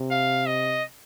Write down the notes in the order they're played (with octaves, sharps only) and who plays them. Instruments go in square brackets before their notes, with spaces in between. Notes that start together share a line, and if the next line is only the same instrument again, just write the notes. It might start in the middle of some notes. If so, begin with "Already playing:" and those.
Already playing: [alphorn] C3
[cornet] F5
D#5